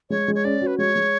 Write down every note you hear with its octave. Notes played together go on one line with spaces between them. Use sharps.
G#3 C#5
G#3
C#5
C#4 D5
F#4
B4
G#3 C#5
G#3